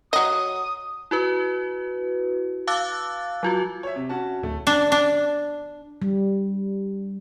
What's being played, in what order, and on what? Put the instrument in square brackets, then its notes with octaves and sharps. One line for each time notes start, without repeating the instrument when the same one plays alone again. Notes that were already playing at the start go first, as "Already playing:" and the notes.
[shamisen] F#3 D#5 [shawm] D#6
[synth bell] E4 F#4 B4
F5 A5 D6 E6 F#6 A6
F#3 F4 F#4
[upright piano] C#5 E5
C3
C#4 F#4 A5
[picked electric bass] D1 [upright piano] A3
[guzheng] D4
D4
[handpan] G3